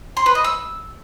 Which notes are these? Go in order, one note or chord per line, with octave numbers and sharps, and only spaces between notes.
C6
B4
D#5
E6